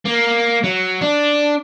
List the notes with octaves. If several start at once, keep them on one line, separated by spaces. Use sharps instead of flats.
A#3
F#3
D4